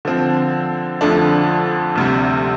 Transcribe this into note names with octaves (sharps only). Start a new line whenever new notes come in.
D3 F3 C4
F2 D3 F3 A3 D4
D2 C3 G3